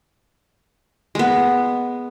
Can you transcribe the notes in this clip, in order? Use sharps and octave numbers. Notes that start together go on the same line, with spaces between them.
G#3 B3